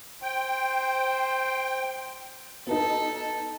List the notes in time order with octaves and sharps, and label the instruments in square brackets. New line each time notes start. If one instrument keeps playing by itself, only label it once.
[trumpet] C5 [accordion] G5
[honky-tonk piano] B3 D#4 [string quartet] A4